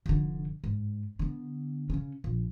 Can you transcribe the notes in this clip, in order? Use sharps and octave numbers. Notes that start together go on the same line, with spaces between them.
F1 D3
G#2
D3 B3
C#3 C#4
A#1